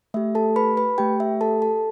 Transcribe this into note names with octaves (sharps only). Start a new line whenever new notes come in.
A3 G4 E5
A4 A5
B4 B5
B4 B5
A3 G4 G5
E5
A4 A5
A4 A5